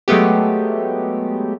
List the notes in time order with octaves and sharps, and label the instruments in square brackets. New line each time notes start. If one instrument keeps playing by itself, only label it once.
[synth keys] F#3 G#3 A3 B3 G4